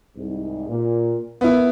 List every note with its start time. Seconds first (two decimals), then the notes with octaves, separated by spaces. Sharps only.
0.15 C2 G#2
0.69 A#2
1.41 A#1 A#3 B3 E4